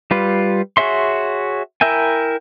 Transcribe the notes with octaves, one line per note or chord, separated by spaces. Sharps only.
G3 F4 B4
F#4 G#4 C#5 E5 C6
E4 A#4 E5 G5 G#5